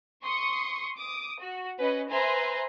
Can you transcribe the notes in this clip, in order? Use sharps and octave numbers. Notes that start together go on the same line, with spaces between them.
C6 C#6 D#6 C#7
D6 D#6
F#4
C#4 B4 D#5
B4 C5 E5 G#5 A#5 C6